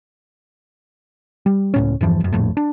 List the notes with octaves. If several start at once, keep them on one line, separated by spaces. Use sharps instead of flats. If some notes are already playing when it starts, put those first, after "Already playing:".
G3
C#2 A2 C#4
E2 G2 E3 F3
F1 F#2
A#1 F2 A2
D4